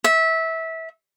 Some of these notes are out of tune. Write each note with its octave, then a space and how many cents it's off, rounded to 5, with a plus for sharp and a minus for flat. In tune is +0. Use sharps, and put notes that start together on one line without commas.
E5 -20